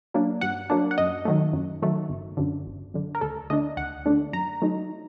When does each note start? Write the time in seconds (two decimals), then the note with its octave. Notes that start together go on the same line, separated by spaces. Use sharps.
0.14 F#3 A#3 D4
0.41 G2 F#5
0.70 F#3 A#3 D4
0.91 F#5
0.98 F#2 D#5
1.25 D#3 F#3 A3
1.53 F#2
1.82 D#3 F#3 A3
2.09 G1
2.37 F#2 D3
2.66 G1
2.94 F#2 D3
3.15 A#4
3.21 D2 A4
3.50 D3 A3 D4 D#5
3.77 D2 F#5
4.06 D3 A3 D4
4.33 F#2 A#5
4.62 F#3 A3 D#4